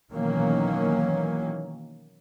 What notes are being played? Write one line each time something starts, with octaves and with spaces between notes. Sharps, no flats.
B2 D#3 E3 F#3 A#3 C#4